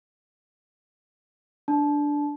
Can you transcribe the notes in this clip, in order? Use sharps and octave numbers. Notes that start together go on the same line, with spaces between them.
D4